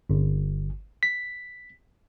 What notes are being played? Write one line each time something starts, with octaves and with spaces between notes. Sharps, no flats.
G1
B6